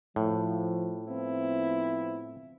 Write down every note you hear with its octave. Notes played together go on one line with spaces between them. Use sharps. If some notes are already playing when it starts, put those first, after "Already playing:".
A2 F3
F3 B3 C4 E4